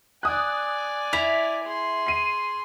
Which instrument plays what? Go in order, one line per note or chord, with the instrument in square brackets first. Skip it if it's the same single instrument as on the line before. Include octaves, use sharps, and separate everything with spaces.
[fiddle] D5 G#5 [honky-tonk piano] D#6 F#6
[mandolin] E4 [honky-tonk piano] F7
[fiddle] G#4 C6
[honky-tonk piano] C7 D#7